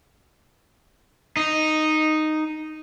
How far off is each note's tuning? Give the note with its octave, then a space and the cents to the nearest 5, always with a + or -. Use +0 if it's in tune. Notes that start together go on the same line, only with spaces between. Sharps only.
D#4 -5